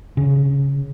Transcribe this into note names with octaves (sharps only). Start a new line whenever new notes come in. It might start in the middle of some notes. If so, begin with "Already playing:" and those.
C#3